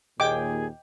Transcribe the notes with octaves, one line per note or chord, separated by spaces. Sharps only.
D#2 A#2 G#4 D#5 G5 D6 G6